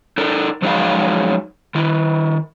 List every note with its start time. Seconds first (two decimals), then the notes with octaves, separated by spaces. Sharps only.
0.18 D#4 A4 A#4
0.62 F3 F#3 G#3 D#4 G#4 F5
1.75 D#3 E4